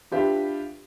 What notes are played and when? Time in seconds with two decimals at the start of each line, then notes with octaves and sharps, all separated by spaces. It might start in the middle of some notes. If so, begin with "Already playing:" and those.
0.12 D4 F4 G4 B4 E5